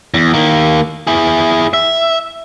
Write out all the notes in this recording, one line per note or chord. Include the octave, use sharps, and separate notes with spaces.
E2
D#3 A#3
E4 G#4
E5